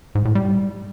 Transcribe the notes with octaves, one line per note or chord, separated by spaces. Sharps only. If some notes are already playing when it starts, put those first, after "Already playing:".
G#2
A2
G3